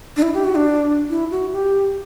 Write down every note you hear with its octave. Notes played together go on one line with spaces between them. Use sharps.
D4
E4
G4
F#4
D4
E4
F#4
G4